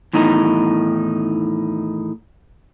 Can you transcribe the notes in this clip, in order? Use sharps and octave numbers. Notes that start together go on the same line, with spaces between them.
E2 A2 D#3 D#4